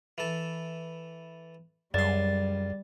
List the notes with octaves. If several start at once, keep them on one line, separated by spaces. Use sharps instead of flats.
E3 A4
C#2 F#2 G3 D5 C6 A6